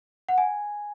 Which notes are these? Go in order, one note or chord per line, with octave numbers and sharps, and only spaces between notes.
F#5
G#5